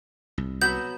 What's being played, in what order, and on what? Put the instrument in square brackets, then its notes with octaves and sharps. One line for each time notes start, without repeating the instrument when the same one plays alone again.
[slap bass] C2
[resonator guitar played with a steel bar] F#3 B3 F#4 [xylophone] G6